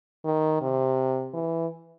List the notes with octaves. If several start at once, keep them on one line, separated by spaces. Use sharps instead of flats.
D#3
C3
E3